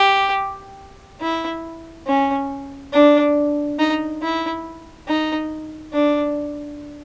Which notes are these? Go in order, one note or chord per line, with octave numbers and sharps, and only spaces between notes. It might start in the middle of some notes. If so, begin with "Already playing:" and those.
Already playing: G4
E4
C#4
D4
D#4
E4
D#4
D4